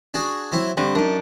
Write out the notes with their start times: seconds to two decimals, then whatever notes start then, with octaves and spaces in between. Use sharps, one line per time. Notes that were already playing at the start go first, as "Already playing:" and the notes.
0.14 D4 F#4 G#4
0.52 F#3 C4 E4
0.77 G2 D3 G3 C4
0.95 F#2 D4 D#4